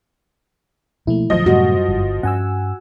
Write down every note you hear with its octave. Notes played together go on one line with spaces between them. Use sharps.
B2 F3 A3 A#3 E4
D1 D2 F3 F#3 D#5
F#2 A2 C3 G3 A3 F#4
G1
G2 C#4 F#5 G#5 E6